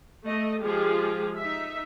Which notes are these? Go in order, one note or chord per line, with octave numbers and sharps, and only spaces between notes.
A3 D#5
F3 G#3 F4 G4 G#4
D#4 E5